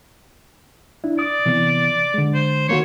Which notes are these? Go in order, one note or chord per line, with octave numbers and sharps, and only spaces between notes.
D4 E4
D5 D#6
C3 E3 B3
D3 G#3
C5
D#3 A#3 F#4 C#5